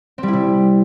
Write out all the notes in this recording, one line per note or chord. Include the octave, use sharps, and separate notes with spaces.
C4
G3
E4
C3